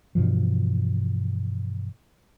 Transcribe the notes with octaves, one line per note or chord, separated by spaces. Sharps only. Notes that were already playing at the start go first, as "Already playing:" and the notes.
G2 B2 E3 F3